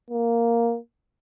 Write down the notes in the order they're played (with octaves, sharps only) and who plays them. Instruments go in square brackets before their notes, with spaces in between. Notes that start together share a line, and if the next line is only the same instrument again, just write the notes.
[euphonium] A#3